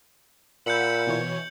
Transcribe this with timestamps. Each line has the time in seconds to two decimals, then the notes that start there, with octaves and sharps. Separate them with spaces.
0.66 A#2 F#5 B5 E6 G6 C#7 F#7
1.07 B2 E3 C#5